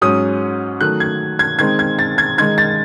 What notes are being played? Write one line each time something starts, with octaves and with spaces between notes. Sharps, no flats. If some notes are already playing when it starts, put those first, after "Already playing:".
G#2 F#3 C#4 D#6
D#3 F#3 A3 F#6
G#6
G#6
D#3 G#3 C4 D#4 G#6
G#6
A6
G#6
D#3 G#3 D#4 G#6
A6